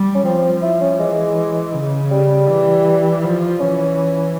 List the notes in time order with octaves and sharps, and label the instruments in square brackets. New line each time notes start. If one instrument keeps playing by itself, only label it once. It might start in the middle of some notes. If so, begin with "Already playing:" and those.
Already playing: [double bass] G3
[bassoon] C#4
[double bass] F3 [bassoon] C4
[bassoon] E4
C#4
[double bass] E3 [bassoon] G#3
[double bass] C#3
[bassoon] G3
[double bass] E3
F3
[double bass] E3 [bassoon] C#4